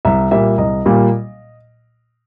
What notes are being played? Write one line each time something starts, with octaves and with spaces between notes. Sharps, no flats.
C2 E5
A#2 G3 A#3 E5
C2 D#5
A#2 G3 A#3